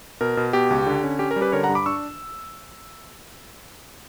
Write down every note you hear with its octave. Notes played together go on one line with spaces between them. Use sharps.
B2 A#4
B2
B2 G4
C#2
D3
C#4
C#4 G4
A#4
G3
G4 B4
D3 A#4 C#5
F#5 A#5
G2
B5 D6
D4 C#6 E6